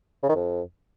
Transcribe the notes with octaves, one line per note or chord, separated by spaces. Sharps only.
C#3
D#3
F2